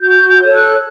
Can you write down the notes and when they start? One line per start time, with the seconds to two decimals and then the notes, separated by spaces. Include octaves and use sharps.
0.01 F#4 G6
0.28 G6
0.42 A4 C#5
0.55 F#6